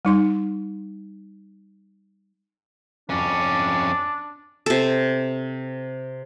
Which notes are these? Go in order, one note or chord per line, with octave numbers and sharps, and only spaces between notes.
G3 D#4 C6
F2 C#4 D4
C3 A4